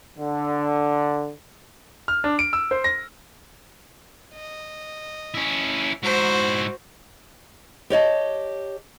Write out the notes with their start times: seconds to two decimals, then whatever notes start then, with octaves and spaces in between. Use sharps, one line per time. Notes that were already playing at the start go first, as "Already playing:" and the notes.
0.18 D3
2.08 F6
2.24 D4
2.39 D7
2.53 E6
2.71 C5
2.84 A#6
4.34 D#5
5.34 C#4 E4
6.03 G#2 E4 F#4 C5
7.90 G4 C#5 D#5 A5